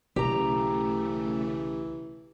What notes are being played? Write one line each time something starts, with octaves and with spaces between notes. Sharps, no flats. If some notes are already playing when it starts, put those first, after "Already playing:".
B1 C#3 E3 A3 G4 A#5